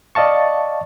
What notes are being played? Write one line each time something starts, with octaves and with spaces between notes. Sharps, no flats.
D5 D#5 F5 A5 C#6